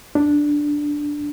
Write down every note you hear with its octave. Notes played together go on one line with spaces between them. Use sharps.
D4